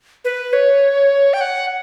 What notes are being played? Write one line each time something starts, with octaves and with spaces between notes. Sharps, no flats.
B4
C#5
G5
F#5